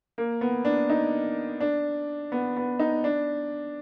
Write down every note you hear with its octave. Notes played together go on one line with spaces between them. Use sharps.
A#3
B3
D4
D#4
D4
B3
B3
D#4
D4